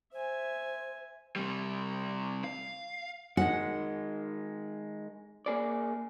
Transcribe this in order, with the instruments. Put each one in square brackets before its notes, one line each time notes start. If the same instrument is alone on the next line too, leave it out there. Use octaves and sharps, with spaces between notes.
[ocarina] C5 [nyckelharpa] E5 G#5
[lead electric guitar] C3 G3
F5
[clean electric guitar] D#3 G#3 [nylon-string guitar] F#5
[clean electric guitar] A#3 G#4 D5